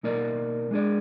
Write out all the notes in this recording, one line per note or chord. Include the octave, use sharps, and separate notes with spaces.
B2 A#3 D#4 A#4 D5
G#3 D4 G#4 D5